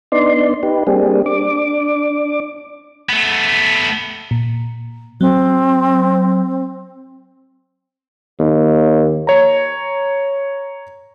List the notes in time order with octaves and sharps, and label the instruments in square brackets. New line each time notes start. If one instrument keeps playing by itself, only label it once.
[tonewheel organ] B3 D4 D#4 D5 C6
D#4 G4 B4
G3 A#3 C4 D4 G4 G#4
D4 D6
[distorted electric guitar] A3 B3
[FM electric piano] A#2
[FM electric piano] F#3 [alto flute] C4
[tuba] D#2
[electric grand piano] C#5 A#5